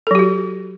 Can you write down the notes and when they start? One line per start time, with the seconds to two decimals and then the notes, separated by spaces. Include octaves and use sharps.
0.07 A4
0.11 F#3
0.15 G4
0.19 F#4